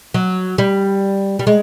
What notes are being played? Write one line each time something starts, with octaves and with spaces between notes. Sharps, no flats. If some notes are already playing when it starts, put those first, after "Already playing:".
F#3
G3
G3
G#3